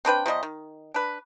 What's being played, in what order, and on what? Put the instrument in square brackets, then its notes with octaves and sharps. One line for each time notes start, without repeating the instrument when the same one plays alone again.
[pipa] C4 D4 B4 G5
C3 F3 G3 D#5
D#3
D4 B4